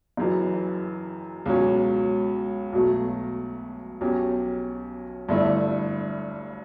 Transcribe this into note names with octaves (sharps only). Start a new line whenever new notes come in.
F#1 F#2 E3
C#2 B2 F#3 C#4
B1 B2 F#3 A3
B1 B2 F#3 C#4 G4
G1 G2 D3 A3 E4